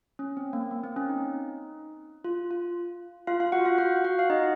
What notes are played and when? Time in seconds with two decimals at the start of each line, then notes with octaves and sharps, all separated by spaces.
0.19 C#4
0.37 C4
0.53 A#3
0.71 A#3
0.84 C4
0.96 C#4
1.09 D#4
2.24 F4
2.51 F4
3.27 F4 F5
3.40 F4 F5
3.52 F#4 F#5
3.65 F4 F5
3.78 F#4 F#5
4.04 F#4 F#5
4.19 F5
4.30 D#4 D#5